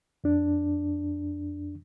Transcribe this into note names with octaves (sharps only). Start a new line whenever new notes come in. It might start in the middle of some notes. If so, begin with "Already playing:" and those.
F2 D4